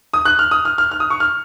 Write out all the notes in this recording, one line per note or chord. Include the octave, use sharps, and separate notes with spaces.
D#6
F#6
F6
D#6
F6
F6
F6
D#6
C#6
F6